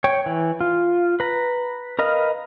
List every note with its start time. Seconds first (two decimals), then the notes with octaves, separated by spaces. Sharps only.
0.04 C#5 G5
0.26 E3
0.61 F4
1.20 B4 A#5
1.99 A#4 B4 D#5 F5